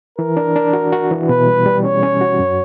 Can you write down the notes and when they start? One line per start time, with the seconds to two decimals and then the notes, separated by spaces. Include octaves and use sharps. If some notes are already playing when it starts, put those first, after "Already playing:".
0.18 E3 A#4
0.37 D4
0.56 D4
0.73 F#4
0.93 F#4
1.11 E3
1.29 B2 B4
1.47 G3
1.66 G3
1.84 C#4 C#5
2.03 C#4
2.21 F#4
2.39 F#2